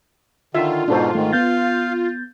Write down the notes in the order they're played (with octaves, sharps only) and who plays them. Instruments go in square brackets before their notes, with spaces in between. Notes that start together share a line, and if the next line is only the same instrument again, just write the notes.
[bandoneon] D3 D#3 [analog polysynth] F4 [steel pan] E5
[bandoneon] G#2 B2 [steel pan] D4 A4 C5
[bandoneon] G#2 D#3 [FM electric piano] A3
[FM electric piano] B3 G6 A6 [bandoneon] F5